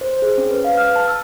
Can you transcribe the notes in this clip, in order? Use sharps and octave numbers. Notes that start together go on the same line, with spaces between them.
C5
G#4
C#4
B4
F5
F6
A5
E6